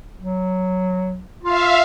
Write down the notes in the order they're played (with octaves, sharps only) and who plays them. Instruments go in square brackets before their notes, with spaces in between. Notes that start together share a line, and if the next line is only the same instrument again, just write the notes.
[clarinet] F#3
[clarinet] F4 [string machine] E5 F5